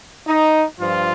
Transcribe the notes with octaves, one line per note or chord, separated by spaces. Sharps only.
D#4
G2 F3 F4